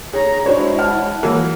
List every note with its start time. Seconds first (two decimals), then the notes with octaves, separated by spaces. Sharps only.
0.13 G#4 C#5 A#5
0.46 G#3 D4 E4 F#4 C5 C#5
0.78 F#5 A5 F6
1.23 E3 F#3 A#3